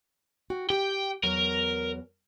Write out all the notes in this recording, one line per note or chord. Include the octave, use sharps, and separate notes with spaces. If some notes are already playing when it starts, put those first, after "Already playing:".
F#4 G5
G4 G5
E2 F#3 A#4